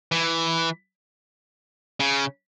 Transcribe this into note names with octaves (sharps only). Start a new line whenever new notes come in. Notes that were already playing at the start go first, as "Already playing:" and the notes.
E3
C#3